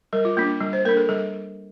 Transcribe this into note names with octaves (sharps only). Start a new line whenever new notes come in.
G3 A#4
F4
A#3 D4 F4
G3
C5
A#3 D4 A#4
A4
G3 A4